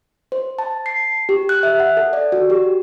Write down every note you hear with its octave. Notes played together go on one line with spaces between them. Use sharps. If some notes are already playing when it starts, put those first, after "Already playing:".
C5
A5
C7
G4
F#6
E5
F#5
A4
D5
F#4
G4